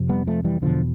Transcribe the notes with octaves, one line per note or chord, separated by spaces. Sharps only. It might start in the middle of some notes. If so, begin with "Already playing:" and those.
Already playing: F2 C3
G3 B3
F3 A3
E3 G3
E2 B2 D3 F3